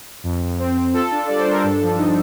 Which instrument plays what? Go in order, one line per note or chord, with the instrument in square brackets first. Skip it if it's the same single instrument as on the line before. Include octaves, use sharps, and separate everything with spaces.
[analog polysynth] F2
F2
C4
C4
F4 A4
D4
G3 D5
C5
D4 A#4
G2 A4
F3
D#4